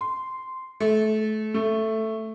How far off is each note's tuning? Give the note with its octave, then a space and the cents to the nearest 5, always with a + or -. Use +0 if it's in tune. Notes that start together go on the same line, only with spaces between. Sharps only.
C6 -10
A3 -25
A3 +5